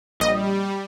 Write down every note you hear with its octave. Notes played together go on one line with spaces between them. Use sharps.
A#1 G3 D#5